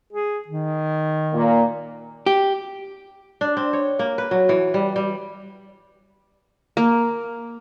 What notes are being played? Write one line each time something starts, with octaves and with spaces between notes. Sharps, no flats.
G#4
D#3
A#2 A#3
G4
D4
C4
C#5
A#3
B4
F#3
E3
G3
G3
A#3